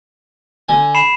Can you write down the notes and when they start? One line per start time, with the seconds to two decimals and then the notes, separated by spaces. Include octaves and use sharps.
0.69 D3 G#5
0.95 B5 C7 E7